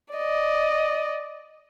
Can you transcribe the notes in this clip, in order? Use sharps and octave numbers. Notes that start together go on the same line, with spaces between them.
D5 D#5